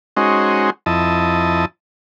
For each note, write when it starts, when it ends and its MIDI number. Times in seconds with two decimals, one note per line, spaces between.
0.17 0.70 56
0.17 0.70 61
0.17 0.70 63
0.17 0.70 66
0.17 0.70 72
0.86 1.65 41
0.86 1.65 64
0.86 1.65 75
0.86 1.65 81